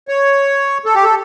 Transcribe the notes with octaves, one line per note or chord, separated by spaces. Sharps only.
C#5
A4
G4
A4